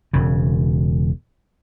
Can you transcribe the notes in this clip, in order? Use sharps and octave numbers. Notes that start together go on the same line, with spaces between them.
E1 C#3